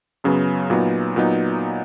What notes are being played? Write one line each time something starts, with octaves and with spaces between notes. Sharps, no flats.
F#2 C#3 F#3 B3
A#2 F#3 B3 D#4
A#2 F#3 B3 D#4